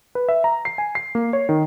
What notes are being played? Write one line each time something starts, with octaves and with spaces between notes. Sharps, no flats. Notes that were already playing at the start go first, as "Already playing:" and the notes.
B4
E5
A#5
C7
G#5
C7
A#3
C#5
D#3